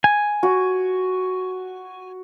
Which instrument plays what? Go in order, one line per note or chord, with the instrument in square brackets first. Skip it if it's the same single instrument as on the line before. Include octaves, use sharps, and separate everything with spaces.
[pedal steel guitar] G#5
[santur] F#4